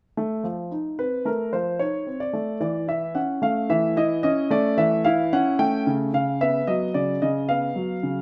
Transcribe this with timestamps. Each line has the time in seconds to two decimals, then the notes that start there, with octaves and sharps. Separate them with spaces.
0.17 A3
0.44 F3
0.71 D#4
0.99 C4 B4
1.25 A3 A#4
1.53 F3 C5
1.79 D#4 C#5
2.07 C4
2.20 D5
2.33 A3
2.60 E3 D5
2.88 E4 E5
3.15 C#4 F#5
3.42 A3 F5
3.70 E3 E5
3.97 E4 D#5
4.23 C#4 D#5
4.51 A3 D5
4.78 E3 E5
5.05 E4 F5
5.33 C#4 F#5
5.59 A3 G5
5.87 C#3
6.13 C#3 F5
6.41 B3 E5
6.67 F#3 D#5
6.94 C#3 D5
7.22 C#3 D#5
7.49 B3 F5
7.76 F#3
8.03 C#3